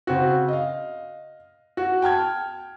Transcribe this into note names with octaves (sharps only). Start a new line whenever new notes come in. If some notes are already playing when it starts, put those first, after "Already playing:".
C#3 C4 F#4
D#5 F5
F#4
G5 A5 F6 G#6